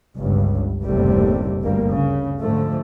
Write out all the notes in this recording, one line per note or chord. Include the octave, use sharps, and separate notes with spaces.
G1 C#2 G2
F#1 D#2 A2 C3 G3 A3
G1 D2 G3 A#3
C#3
G#2 D3 F3 A3